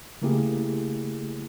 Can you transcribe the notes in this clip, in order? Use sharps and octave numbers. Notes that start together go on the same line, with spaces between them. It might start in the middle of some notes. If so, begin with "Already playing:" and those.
C#3 A3 A#3 E4 G4 G#4